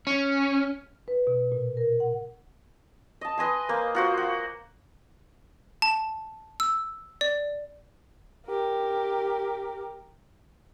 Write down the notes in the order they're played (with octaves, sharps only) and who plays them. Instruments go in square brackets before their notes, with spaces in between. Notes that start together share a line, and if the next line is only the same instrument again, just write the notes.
[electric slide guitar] C#4
[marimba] B4
B2
A#2
A#4
F#5
[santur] D#5 A5
B4 D#5 G#5 C6
A#3 C5
F4 F#4 C5
F#4
[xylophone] A5
E6
D5
[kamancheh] G4 A#4